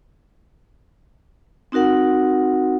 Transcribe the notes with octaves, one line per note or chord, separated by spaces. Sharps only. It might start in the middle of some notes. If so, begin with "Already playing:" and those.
C4 D#4 F#4 A#4 F#5